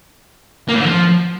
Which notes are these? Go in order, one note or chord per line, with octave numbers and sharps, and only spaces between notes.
A#3
A2
D3
F3